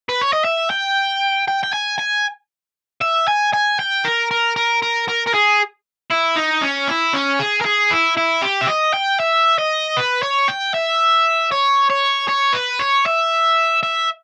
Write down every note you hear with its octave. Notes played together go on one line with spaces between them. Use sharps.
B4
C#5
D#5
E5
G5
G5
G5
G#5
G#5
E5
G#5
G#5
G5
A#4
A#4
A#4
A#4
A#4
A#4
G#4
E4
D#4
C#4
E4
C#4
G#4
A#4
G#4
E4
E4
G4
E5
D#5
G5
E5
D#5
B4
C#5
G5
E5
C#5
C#5
C#5
B4
C#5
E5
E5